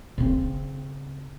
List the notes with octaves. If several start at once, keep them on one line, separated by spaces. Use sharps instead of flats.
C#3 C4